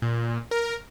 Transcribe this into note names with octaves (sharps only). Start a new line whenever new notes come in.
A#2
A#4